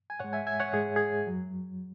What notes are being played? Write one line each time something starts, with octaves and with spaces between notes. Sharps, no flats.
G#5
G#2 G#3 C#5 F#5
E5 G#5
E5 G#5
C#5 F#5
G#2 G#3 G#4
G#4
F#2 F#3